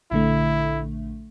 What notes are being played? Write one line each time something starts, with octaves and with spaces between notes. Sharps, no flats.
A#1 D3 A3 E4